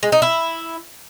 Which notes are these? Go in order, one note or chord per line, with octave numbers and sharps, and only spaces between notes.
G#3
D#4
E4